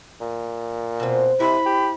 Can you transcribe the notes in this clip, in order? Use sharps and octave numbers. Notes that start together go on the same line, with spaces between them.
A#2
B2 C4
C3 E4 B5
G4